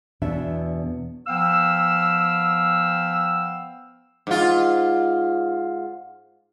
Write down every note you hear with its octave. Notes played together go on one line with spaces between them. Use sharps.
E2 B2 D4 E5
F3 B3 F5 G5 E6
G#2 F4